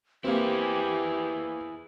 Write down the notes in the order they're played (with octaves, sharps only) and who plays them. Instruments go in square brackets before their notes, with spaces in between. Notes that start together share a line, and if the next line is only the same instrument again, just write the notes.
[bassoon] E3 [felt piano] A#3 C4 [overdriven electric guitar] E4 G#4 [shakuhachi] G4